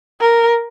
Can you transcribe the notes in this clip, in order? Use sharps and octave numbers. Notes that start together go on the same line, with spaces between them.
A#4